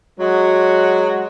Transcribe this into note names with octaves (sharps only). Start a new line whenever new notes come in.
F#3 G#3 F#4